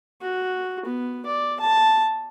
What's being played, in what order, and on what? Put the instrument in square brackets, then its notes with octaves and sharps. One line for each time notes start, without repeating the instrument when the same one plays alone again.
[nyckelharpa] F#4
B3
D5
A5